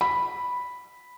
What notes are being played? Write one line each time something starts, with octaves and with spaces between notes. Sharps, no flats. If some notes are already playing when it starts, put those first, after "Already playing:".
B5